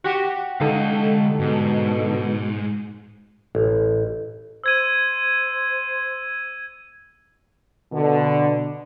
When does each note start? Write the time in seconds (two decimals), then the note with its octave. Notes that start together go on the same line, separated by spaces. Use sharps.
0.04 F#4 G4 F#5
0.61 D3 G#3 D#4 A4 F5
1.39 G#2 B2
3.55 A1
4.64 C5 E6 G#6 D#7
7.93 B2 D3